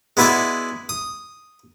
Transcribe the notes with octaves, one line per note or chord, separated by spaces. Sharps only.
G#3 B3 E4 F#4 D5 E5
D#6